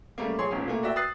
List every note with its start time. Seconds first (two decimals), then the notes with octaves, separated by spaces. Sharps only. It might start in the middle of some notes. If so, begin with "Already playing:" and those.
0.18 C#3 G3 A3 A#3
0.39 A#1 G#4 C#5 C6
0.51 F1 A#2 C#4
0.66 A#2 A3 A#3
0.83 F#4 D5 E5 G5 E6
0.96 D#6 E6 F#6 A6 C7